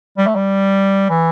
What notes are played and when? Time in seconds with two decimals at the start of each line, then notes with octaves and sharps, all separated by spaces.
0.18 G3
0.27 A3
0.35 G3
1.10 E3